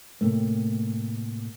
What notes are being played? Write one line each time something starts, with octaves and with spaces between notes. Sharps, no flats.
A2 C3 A3 A#3